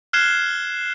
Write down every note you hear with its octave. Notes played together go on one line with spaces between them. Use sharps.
F6 F#6 G#6 C7 E7 G7